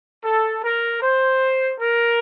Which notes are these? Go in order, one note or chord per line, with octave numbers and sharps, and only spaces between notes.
A4
A#4
C5
A#4